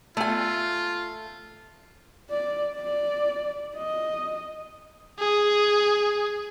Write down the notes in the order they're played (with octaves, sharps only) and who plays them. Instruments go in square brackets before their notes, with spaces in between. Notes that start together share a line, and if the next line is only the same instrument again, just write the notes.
[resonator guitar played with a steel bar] A3 G#5 [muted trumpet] F4
[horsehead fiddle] D5
D5
D#5
[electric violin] G#4